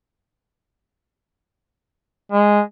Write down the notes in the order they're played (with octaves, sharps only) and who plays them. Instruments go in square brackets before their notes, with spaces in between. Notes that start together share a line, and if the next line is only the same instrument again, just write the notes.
[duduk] G#3